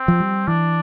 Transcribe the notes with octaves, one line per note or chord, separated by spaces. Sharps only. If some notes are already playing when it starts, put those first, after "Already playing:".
Already playing: C4
F3
G3
E3 D4